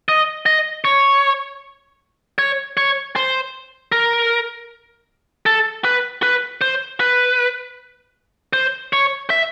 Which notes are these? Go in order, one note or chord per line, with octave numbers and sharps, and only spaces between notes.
D#5
D#5
C#5
C#5
C#5
C5
A#4
A4
B4
B4
C5
B4
C5
C#5
E5